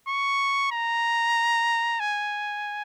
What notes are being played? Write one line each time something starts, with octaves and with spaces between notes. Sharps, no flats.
C#6
A#5
G#5